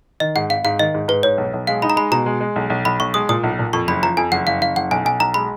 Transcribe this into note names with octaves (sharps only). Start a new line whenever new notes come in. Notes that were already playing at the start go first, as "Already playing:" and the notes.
D#3 D#5
G#2 F#5
G#1 F5
G#2 F5
D#3 D#5
G#2
G#2 B4
G#2 C#5
B1
B1
G#3 F5
D#4 B5
A#5
G#3 B5
B2 A#5
G#3
G#3
B1
B1
B1 B5
B1 C#6
G#3 D#6
A#2 D#6
B1
A#2
F2 C#6
F#1 B5
F3 A#5
F2 G#5
F#1 F#5
F#1 F5
F#1 F5
F#1 F#5
B1 G#5
B1 G#5
B1 A#5
G#3 B5